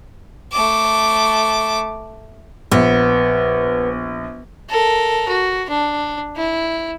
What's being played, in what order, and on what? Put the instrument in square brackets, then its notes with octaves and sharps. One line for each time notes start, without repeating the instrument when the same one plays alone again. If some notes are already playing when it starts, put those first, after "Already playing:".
[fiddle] A3 D6
[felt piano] A#1 [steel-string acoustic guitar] B3
[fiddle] A4 A#4
F#4
D4
E4